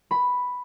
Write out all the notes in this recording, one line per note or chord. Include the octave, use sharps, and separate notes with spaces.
B5